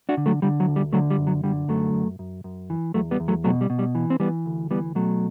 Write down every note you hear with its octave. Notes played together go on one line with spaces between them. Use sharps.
D4 F#4
D3
F#3 A3
D3 G3
F#3
D2
G3
D3 F#3 A3
G3
F#2
F#3
D3 G3
F#2 F#3 A3
F#2
F#2
F#2
E3
E2 F#3 A3
G3 B3
E2
F#3 A3
B2 F#3 A3
G3
B2
G3
E3
C4
E3 G3 B3
D2
E3 G3 B3
B2 F#3 A3